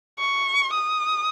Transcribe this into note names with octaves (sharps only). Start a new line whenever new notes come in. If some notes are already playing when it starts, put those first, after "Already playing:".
C#6
D#6